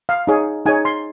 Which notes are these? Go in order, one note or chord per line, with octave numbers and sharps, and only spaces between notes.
F5
D#4 G#4 C#5
D#4 G#4 C#5 G#5
C6